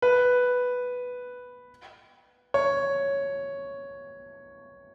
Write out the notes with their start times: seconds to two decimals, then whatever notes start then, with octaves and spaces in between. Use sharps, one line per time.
0.02 B4
2.54 C#5